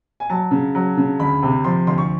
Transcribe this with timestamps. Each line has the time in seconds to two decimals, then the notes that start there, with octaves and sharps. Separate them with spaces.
0.20 G#5
0.30 F#3 A5
0.51 C#3
0.75 F#3
0.97 C#3
1.20 D2 B5
1.42 C3
1.64 F3 C6
1.87 D2 C6
1.98 C#6